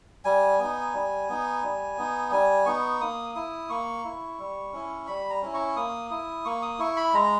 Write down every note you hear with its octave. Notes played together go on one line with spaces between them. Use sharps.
G3 G#5
B3 D#4
G3
B3 D#4
G3
B3 D#4
G3 G#5
B3 D#4 C#6
A#3 D#6
E4 D#6
A#3 C#6
E4
G3
C#4 E4
G3 B5
A#5
C#4 E4
C#6
A#3 D#6
E4 D#6
A#3 C#6
D#6
E4 C#6
B5
G#3 A#5